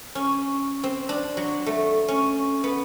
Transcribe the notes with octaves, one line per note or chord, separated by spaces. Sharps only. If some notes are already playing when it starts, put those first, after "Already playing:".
C#4
C4
D4
F#3
A3
C#4
B3